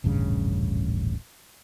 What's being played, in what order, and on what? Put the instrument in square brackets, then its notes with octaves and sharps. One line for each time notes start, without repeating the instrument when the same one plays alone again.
[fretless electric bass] D#1 A1 G2 C#3